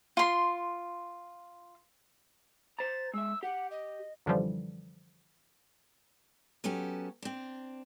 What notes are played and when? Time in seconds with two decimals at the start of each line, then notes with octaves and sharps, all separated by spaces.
0.17 F4 C6
2.79 C5 A#5 A6
3.13 G#3 E5 E6
3.43 G4 F#5
3.71 D#5
4.26 F#2 D3 E3 F3 G3
6.64 F#3 B3 C#4 G4 A4
7.22 C4 D4